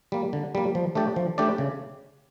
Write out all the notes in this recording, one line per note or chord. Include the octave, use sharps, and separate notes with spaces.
G3 A#3
D3
G3 A#3
F3
A3 D4 G4 D5
F3
A3 D4 G4 D5
C#3